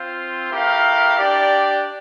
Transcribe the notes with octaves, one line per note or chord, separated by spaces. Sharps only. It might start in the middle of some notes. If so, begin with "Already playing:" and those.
Already playing: C4 F4 C5
A3 E4 G4 A#4 F5
D4 G4 D5